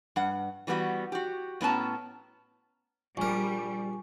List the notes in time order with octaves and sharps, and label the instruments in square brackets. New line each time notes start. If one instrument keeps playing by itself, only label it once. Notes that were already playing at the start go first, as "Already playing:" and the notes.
[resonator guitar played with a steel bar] G2 F#5
E3 G3 B3 D#4 F#4
F#4 G4
A2 B3 C#4 A5 A#5
[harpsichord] A#1 A#4 [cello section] G3 [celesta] G#5 C#6